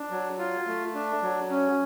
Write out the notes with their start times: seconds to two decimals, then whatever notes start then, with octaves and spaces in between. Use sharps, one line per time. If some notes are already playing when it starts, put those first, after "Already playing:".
Already playing: D4
0.10 F#3
0.38 F4
0.67 A3
0.94 D4
1.22 F#3
1.50 C#4